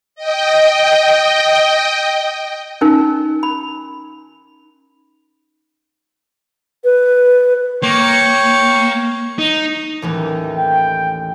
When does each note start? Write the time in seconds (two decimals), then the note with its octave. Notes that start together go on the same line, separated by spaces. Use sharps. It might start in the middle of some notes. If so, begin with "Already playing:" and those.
0.15 D#5 G5
2.81 C#4 D#4 A#4 G#5
3.43 B5
6.84 B4
7.83 A#3 C#5 G5 C#6
9.39 D#4
10.02 A1 D#2 E3
10.58 G5